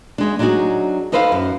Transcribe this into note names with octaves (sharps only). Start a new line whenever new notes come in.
E2 G#3 D4
F#3 D4 D#4 F4 F#4 G#4
D#4 A4 B4 C5 D#5 F5
F#2